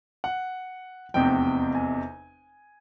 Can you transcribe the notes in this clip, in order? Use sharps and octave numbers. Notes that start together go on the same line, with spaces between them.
F#5
F1 E2 C3 G5
G#5